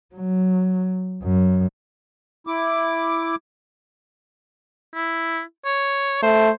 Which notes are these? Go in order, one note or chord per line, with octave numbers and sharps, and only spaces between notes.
F#3
F#2
E4 D6
E4
C#5
A3 C5